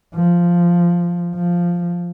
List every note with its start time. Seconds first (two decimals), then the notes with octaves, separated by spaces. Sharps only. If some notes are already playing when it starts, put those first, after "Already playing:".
0.15 F3
1.35 F3